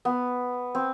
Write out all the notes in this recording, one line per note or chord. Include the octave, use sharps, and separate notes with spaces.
B3
C4